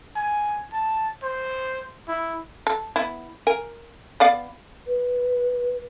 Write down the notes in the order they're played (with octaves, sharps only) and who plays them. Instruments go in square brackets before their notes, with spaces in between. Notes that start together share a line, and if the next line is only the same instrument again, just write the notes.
[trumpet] G#5
A5
C5
E4
[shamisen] A4
B3 E4
A#4 G#5
B3 D5 F5
[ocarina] B4